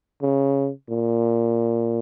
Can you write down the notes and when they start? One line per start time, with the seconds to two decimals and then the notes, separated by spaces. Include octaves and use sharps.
0.22 C#3
0.89 A#2